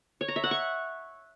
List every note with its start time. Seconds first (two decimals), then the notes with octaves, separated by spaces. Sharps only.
0.21 C#5
0.28 A#5
0.36 E5
0.44 F#5
0.51 C#6